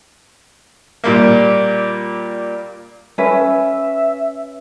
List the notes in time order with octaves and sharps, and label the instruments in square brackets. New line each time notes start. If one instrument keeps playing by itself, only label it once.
[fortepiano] A#2 G3 A#3
[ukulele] C#4 B4 [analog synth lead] E5